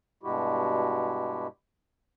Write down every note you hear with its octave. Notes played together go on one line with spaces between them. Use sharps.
G2 B2 G#3 E4 F#4 G4